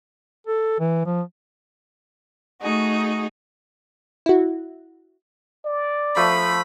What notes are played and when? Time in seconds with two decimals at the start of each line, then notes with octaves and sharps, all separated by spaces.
0.47 A4
0.80 E3
1.06 F3
2.61 A3 D#4 F#4 G#4
4.26 E4 F#4
5.65 D5
6.17 F3 A3 B5